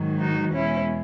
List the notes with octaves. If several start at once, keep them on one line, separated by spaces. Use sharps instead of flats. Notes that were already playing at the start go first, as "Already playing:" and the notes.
Already playing: G#2 D#3 F#3
D#4 F#4
E2 B2 G#3 C#4 E4